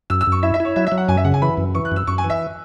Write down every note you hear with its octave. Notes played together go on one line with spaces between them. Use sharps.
F#2 E6
E6
F#2
C#6
E4 E5
E5
E4 C#5
F#3 E5
E5
F#3
F#5
F#2 G#5
E5
C#3 F#5
G#5
E3 B5
F#2
E3 C#6
F#6
F#2 E6
F#2 C#6
G#5
E3
E5